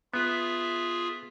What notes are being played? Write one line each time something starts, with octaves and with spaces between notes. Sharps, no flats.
B3 F4 G#4 E5